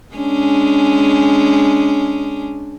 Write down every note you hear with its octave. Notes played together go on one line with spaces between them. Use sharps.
G#3 C#4 D4